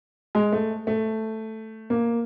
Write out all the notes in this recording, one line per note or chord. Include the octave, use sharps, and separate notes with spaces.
G#3
A3
A3
A#3